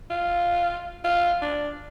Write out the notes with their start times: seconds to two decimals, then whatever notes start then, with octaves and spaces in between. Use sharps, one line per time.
0.10 F4
1.04 F4
1.42 D4